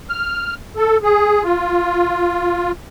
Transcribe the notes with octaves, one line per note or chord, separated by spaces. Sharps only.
F6
A4
G#4
F4